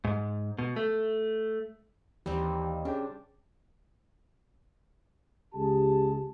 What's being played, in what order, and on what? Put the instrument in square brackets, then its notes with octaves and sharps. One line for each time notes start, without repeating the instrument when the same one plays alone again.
[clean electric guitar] G#2
B2
A3
[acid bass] D#2 [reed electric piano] E3 [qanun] G3 C4
[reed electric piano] C#4 G#4 G5 [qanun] D4
[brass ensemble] C#2 G4 G#4 A5